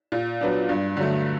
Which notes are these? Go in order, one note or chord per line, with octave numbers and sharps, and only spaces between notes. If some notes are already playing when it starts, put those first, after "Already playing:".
A#2
F#3 B3 D4
G2
D3 F#3 A3